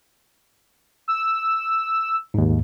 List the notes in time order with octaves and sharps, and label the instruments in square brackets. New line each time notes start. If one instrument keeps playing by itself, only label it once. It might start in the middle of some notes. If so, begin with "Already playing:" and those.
[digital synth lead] E6
[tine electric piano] D#2 G#2